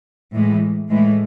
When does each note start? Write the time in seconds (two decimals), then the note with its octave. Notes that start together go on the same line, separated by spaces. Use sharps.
0.33 A2 E3 G#3
0.89 A2 E3 G#3